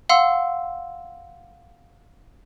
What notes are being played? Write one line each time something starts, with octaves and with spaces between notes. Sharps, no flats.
F5 F#5 C6 E6